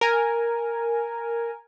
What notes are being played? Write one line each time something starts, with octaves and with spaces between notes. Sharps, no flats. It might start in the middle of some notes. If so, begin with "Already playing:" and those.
A#4 G#5